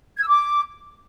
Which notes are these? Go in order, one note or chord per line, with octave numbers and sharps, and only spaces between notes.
G#6
E6
D6